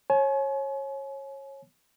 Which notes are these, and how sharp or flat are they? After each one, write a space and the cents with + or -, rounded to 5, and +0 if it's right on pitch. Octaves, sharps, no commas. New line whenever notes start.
C#5 -25 G#5 +40